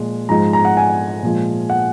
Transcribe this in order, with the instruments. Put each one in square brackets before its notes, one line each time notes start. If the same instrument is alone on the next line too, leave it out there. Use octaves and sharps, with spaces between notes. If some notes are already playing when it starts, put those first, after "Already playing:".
Already playing: [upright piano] A#2 F3 G#3
G#2 F3 G#3 A#5
A#5
F#5
G#5
A#2 F3 G#3
F#5